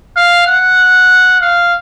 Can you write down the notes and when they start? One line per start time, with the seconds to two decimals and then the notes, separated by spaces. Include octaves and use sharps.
0.16 F5
0.46 F#5
1.41 F5